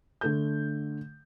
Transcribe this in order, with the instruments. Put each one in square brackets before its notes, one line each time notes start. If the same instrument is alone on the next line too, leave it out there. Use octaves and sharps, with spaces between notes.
[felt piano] D3 A3 G6